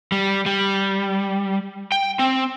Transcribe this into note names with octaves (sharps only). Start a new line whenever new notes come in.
G3
G3
G5
C4